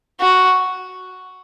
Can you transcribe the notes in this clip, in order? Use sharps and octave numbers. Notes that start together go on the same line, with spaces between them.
F#4